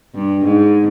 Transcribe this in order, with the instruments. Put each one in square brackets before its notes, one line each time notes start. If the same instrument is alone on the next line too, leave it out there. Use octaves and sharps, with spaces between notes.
[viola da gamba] G2
G#2